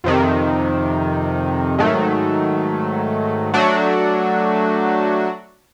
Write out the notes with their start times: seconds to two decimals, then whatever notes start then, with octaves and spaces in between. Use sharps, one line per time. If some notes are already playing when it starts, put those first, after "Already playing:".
0.04 F2 C3 D#3
1.78 G#2 D#3 F#3 A3
3.54 F#3 A3 D4 F#4